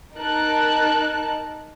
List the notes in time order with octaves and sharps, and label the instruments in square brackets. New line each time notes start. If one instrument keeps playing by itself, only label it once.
[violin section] D#4 A#4 A5 F#6